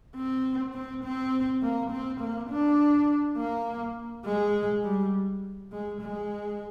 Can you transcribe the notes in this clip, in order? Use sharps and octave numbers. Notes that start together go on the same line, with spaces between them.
C4
C4
C4
A#3
C4
A#3
D4
A#3
G#3
G3
G#3
G#3